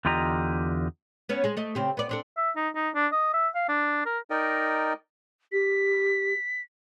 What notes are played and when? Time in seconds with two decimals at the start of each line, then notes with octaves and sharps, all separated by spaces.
0.05 E2 D3 F4 G4 D#5 A#5
1.29 B3 C#4 F#4
1.44 G#3 G#4
1.57 A3 D#5
1.75 C#3 C4 G4
1.97 B3 D5
2.09 C4 D4 A4
2.37 E5
2.56 D#4
2.76 D#4
2.95 D4
3.12 D#5
3.34 E5
3.55 F5
3.69 D4
4.06 A#4
4.30 D#4 A#4 D5 D#5 G5
5.52 G4 B6